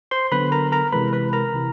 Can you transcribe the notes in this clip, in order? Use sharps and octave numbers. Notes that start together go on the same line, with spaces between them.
C5 C6
D3 F#3 B3 B4 B5
A#4 A#5
A#4 A#5
C3 E3 G#3 B4 B5
B4 B5
A#4 A#5
C3 E3